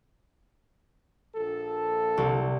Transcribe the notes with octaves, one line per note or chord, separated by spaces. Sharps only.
A#1 A4
C2